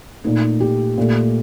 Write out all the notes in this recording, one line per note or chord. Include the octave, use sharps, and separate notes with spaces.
A#2 A3 D#4
G4
A#2 A3